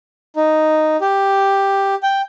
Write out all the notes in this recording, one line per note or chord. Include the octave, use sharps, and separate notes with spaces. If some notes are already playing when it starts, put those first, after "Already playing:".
D#4
G4
G5